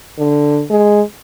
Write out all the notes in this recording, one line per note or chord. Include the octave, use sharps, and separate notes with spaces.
D3
G#3